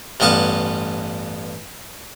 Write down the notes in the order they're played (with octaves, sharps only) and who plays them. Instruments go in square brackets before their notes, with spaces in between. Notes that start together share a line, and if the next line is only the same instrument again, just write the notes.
[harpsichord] A1 G2 B3 F5 A5